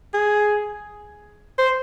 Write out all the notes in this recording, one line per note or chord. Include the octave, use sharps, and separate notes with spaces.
G#4
C5